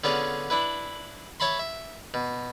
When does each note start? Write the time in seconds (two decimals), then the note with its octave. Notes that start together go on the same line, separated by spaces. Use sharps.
0.04 D3 B3 C#4 F4 G#4 D5
0.50 D4 E4 B4
1.40 C#5 E5 A5 B5 C6
1.59 E5
2.14 B2